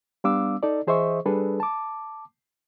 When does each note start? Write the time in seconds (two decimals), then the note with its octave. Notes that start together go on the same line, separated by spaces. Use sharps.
0.24 G3 B3 D4 F5 D6 E6
0.63 D#4 A4 D5
0.87 E3 G#4 C5 D#5 E5 C#6
1.26 G3 D4 G#4 A4 B4
1.60 A5 D6